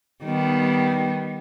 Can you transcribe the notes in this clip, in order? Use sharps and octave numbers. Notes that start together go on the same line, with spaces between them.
D#3 G3 B3